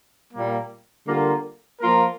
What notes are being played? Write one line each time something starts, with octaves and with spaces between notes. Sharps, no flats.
A#2 G3 A#3
D3 G3 A#3 F4 A#4
F3 A#3 F4 A#4